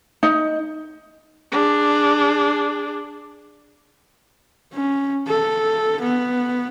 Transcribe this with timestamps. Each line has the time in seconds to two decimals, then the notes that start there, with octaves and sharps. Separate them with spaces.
0.23 D#4
1.52 D4 G#4
4.74 C#4
5.27 A4
6.01 B3